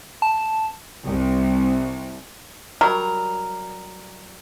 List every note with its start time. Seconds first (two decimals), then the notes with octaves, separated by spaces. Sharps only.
0.22 A5
1.05 C2
2.81 F#3 G3 A#4